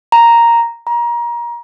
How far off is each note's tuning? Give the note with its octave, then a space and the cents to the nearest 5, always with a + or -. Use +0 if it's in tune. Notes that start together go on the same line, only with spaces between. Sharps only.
A#5 +0
A#5 +25